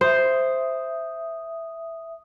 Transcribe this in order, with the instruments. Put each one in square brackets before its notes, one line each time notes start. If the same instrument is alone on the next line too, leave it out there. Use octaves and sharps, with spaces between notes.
[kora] C5 [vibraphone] E5 D#6